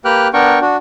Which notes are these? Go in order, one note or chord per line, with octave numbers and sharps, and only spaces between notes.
A#3 G4 B4 G5 F6 F#6
B3 D4 A#4 G5 C#6
D4 F#4